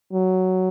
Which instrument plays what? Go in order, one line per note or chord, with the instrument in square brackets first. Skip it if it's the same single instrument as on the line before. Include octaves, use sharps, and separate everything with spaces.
[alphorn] F#3